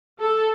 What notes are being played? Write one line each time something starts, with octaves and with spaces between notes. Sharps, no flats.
A4